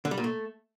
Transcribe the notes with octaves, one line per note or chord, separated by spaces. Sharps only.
D3
G3
A#2
A3